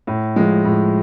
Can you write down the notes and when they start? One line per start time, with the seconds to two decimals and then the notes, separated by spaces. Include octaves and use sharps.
0.07 A2
0.36 F3 G#3
0.65 A2